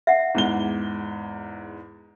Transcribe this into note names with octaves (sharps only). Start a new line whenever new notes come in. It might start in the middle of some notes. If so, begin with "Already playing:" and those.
E5 F#5
E2 G#2 G7